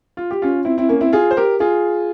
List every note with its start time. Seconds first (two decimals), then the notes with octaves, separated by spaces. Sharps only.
0.17 F4
0.31 G4
0.42 C#4 F4
0.65 C4 E4
0.78 C4 E4
0.89 A#3 C#4
1.01 C4 E4
1.12 F4 G#4
1.31 C5
1.37 G4 A#4
1.60 F4 G#4